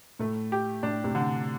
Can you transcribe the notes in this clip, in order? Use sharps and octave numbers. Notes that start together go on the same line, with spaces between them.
A2 A3
G4
A2 D4
A2 C3
D3